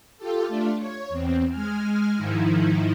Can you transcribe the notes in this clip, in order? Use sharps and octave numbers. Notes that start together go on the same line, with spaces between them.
F4 G4 A4
A3 D4 F4
C#5
E2 C4
G#3 G#5 F6
G#2 D#3 F3 D#4 E4